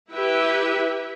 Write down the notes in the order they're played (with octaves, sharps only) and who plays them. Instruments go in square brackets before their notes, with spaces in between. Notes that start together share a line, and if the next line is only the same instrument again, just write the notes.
[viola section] E4 G4 B4 E5